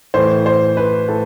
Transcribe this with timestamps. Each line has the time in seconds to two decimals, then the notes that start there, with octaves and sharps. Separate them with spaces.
0.14 A2 E3 C5
0.46 C5
0.77 B4
1.08 A2 A4